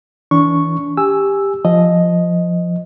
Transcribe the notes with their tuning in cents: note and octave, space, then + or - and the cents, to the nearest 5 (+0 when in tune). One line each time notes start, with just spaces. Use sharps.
E3 -15 D4 -35 C#6 +0
G4 +10 G#5 +0 E6 +0
F3 +0 D#5 +0